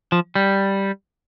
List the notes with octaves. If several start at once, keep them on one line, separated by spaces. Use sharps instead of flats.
F3
G3